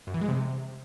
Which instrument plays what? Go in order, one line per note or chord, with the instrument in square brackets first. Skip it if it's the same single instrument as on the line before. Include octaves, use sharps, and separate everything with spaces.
[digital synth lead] F#2
E3
G#3
C3